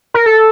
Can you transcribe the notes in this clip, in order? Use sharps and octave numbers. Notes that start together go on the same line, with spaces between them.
A#4
A4